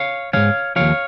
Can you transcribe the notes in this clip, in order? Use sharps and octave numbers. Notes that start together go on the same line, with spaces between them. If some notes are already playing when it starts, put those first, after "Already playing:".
Already playing: C#5 F5
G#2 F3 C#5 F5
D#2 C#3 F3 C#5 F5